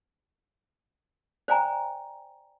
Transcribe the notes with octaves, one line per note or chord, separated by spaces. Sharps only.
C5 D5 G5 G#5 A#5